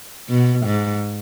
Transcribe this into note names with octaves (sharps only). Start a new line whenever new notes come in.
B2
G#2